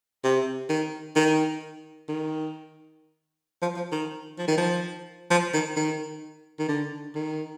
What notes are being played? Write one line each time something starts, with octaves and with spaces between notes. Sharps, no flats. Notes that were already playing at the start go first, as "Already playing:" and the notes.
C3
D#3
D#3
D#3
F3
F3
D#3
F3
D#3
F3
F3
D#3
D#3
D#3
D3
D#3